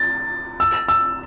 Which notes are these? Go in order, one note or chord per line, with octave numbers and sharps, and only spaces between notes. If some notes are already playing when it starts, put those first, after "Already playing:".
Already playing: A6
E6
E6